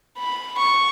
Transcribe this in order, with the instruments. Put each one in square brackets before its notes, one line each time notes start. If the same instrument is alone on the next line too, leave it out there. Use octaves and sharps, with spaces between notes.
[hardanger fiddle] B5
C#6